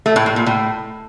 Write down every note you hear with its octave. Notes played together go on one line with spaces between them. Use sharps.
A3
A2
A2
A#2
A2